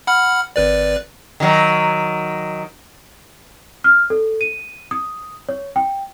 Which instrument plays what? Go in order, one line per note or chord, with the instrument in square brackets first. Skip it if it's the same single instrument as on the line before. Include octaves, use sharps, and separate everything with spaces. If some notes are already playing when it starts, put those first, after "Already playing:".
[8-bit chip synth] F#5 B5 F6
G#1 B4 D5
[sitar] D#3 F#3
[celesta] F6
A4
D#7
D#6
C#5
G5